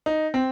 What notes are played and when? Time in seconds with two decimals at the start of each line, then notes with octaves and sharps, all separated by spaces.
0.06 D#4
0.34 C4